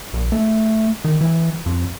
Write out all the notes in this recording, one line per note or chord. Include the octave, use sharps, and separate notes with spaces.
A#1
A3
D#3
E3
F2